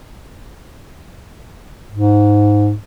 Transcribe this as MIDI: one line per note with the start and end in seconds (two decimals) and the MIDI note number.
1.91 2.74 44